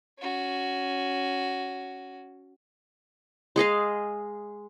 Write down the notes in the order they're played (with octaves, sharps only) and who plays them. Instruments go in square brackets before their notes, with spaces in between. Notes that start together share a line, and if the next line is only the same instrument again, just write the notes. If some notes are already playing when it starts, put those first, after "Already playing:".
[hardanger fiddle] C#4 F#4
[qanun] G#3 G#4 D#5 F5